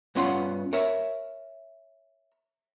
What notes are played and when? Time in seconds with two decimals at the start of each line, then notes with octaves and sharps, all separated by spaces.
0.15 G2 B3 C#4 F4 F#5 C6
0.73 A#4 C#5 E5